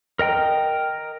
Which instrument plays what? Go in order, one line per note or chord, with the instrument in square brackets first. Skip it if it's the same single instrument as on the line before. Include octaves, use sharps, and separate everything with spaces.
[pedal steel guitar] A#4 D#5 G5 A#5